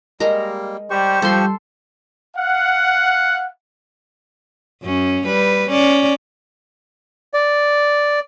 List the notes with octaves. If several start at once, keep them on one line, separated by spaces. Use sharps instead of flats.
G3 G#3 A#3 A#4
G3 G4 C5 C#6
F3 G3 A4 C6
F5 F#5
F#2 C#4
G3 B4
C#4 D5
D5